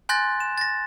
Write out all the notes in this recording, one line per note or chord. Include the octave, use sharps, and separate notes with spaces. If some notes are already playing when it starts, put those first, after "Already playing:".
G#5 C6 F#6 G6 A6 A#6
E7
A6 A#6